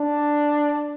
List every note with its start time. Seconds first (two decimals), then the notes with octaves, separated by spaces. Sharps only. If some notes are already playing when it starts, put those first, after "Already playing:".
Already playing: D4